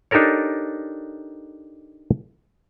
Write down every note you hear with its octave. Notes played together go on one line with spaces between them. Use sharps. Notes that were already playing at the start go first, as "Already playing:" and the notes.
D4 D#4 G4 A4 A#4 C#5